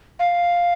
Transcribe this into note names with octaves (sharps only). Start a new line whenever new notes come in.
F5